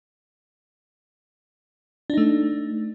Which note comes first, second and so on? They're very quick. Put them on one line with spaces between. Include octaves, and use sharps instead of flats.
D4 D#4 A3